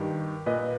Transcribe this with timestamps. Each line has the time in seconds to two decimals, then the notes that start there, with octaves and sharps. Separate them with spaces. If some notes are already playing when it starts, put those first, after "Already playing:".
Already playing: G2 D#3 G4
0.46 A#2 B4 D#5